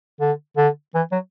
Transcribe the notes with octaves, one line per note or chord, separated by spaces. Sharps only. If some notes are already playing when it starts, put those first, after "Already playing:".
D3
D3
E3
F#3